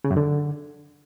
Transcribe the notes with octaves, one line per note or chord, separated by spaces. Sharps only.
C#3
F#2
D3